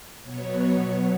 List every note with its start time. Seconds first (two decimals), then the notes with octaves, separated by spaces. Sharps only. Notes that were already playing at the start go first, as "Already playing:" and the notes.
0.23 B2 F#3 B3 C#5